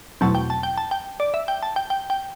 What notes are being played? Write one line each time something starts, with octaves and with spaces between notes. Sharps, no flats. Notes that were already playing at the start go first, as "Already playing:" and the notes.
E2 B2 F#3 A3 C4 A5
G5
A5
G5
A5
G5
D5
E5
G5
A5
G5
G5
G5